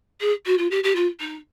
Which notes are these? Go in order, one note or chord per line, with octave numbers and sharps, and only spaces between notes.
G#4
F#4
F4
G4
G4
F4
D#4